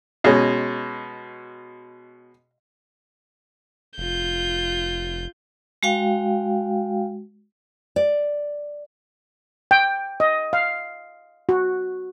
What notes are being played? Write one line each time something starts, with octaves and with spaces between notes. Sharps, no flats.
B2 G#3 C#4
F1 F4 G6
G#3 F#4 F5 G5
D5
G5
D#5
F5
F#4